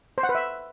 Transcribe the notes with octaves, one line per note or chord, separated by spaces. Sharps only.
C5
F#5
B4
E5